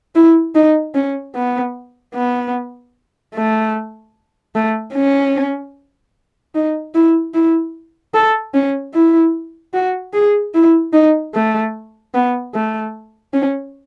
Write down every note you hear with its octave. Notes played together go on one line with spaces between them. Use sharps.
E4
D#4
C#4
B3
B3
A3
A3
C#4
D#4
E4
E4
A4
C#4
E4
F#4
G#4
E4
D#4
A3
B3
A3
C#4